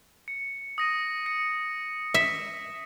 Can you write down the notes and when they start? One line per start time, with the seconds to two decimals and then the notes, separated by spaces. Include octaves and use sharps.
0.28 C#7
0.78 D#6 A#6 D#7
1.26 C#7
2.14 E5